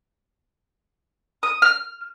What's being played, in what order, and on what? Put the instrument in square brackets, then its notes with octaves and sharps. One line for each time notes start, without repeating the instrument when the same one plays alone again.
[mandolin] D#6
F6